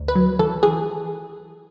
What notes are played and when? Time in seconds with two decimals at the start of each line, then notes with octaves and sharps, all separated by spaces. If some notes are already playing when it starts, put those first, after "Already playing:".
Already playing: D2
0.08 B4
0.15 F#3
0.39 E3 A4
0.63 E3 G#4